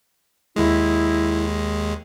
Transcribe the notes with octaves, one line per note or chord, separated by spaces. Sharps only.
D#2 G#3 E4